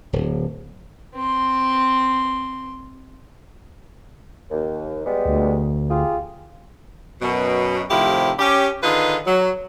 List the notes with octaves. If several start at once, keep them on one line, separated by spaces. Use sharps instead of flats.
D1
C4 C6
D#2
G3 G#3 B3
D2
F4 G4 G#4
F#2 B2
A2 C3 D#3 F3 E4 G4
C#4 G4
D3 D#3 D#4 F4 G#4 B4
F#3